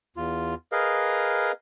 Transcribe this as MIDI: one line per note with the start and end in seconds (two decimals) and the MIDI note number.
0.17 0.54 40
0.17 0.54 65
0.72 1.52 68
0.72 1.52 70
0.72 1.52 71
0.72 1.52 75
0.72 1.52 77